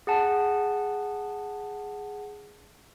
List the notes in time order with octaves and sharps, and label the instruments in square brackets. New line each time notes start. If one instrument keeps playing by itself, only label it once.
[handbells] G#4 F#5 A5